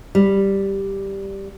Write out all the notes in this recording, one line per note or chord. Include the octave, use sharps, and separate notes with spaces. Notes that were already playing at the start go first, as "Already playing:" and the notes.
G3